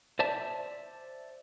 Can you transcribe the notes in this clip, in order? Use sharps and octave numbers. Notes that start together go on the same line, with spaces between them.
C5 D5 E5 A5